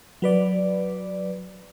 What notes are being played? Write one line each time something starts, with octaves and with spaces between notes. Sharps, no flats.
F#3 B4 D5